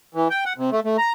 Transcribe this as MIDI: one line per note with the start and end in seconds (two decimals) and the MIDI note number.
0.15 0.28 52
0.30 0.44 79
0.46 0.53 78
0.58 0.70 48
0.72 0.80 57
0.85 0.97 57
0.98 1.13 82